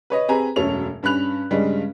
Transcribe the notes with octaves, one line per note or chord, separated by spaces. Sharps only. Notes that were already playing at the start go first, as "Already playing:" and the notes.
B4 C#5 D#5
C4 G4 G#4 B4 G#5 A#5
E1 F#2 A3 A4 C#5 F7
G2 C#4 B5 F#6 F7
G2 C#3 G3 G#3 C#4